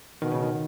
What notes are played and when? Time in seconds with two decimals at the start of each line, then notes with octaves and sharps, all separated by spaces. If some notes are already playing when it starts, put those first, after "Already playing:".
0.22 B2 D#3
0.32 C#3
0.43 D#3